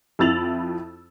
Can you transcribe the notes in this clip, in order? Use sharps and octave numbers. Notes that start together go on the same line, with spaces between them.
F2 E4 E6 A6 F7 F#7